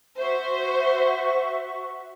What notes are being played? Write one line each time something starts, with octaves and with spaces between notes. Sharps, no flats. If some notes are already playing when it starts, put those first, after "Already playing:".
F#4 C5 E5 C#6